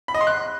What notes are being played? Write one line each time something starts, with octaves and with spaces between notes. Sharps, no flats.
B5
D#5
C6
F#6